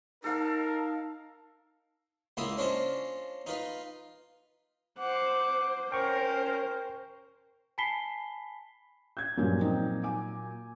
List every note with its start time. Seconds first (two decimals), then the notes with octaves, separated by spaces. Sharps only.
0.24 D#4 A4 A#4 F5 A5
2.37 C#2 A#3 E4 F4 D#6
2.57 C#4 D4 F4 C5 D#5
3.46 D#4 F4 B4 C6
4.99 C5 F#5 D6
5.92 C#4 A#4 C5 G5 C#6
7.78 G#5 A5 B5 B6 C7 G7
9.17 G6 G#6
9.38 G2 A#2 F3 F#3 C#4
9.60 A#3 C4 D#4
10.04 G#5 D6